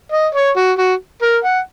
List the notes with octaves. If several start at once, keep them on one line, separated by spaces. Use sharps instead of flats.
D#5
C#5
F#4
F#4
A#4
F#5